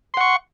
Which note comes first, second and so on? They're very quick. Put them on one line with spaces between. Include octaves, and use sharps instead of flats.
C6 F#5 C#6